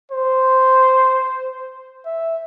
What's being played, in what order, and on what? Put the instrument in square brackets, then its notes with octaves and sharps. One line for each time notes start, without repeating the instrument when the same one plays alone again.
[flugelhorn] C5
E5